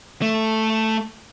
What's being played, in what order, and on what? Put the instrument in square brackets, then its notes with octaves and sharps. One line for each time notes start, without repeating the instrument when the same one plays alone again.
[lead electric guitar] A3